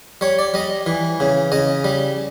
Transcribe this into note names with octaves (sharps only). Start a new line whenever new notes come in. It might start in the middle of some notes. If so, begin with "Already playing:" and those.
G3 C#5
D5
G3 D#5
E3
C#3
C#3 D#5
G3